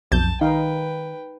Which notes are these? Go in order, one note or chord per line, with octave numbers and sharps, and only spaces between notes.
B1 F2 A5 G6
D#3 D#4 B4 F5 G5